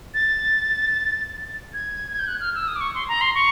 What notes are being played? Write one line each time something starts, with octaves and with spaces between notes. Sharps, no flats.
A6
G#6
G#6
G6
F#6
F6
E6
D#6
D6
C#6
C6
A#5
C6
C#6